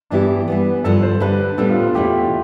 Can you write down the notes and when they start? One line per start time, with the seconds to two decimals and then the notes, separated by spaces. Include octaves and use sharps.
0.10 G2 E3 B3 D4 E4 G4
0.48 E3 G3 B3
0.84 G2 D3 F3 A4
1.02 C5
1.20 D3 G3 D4 B4
1.58 A2 G3 B3 D4 A4
1.70 F4
1.82 F4
1.95 E2 B2 A3 E4 G4